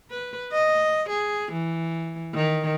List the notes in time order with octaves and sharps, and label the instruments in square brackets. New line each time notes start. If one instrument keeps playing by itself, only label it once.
[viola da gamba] B4
D#5
G#4
E3
D#3